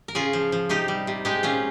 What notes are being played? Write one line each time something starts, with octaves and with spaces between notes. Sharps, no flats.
A#4
C#3 F4 G#4
F3
F3
C3 D#4 G4
G3
C3
G#3 D#4 G4
A#2 C#4 F4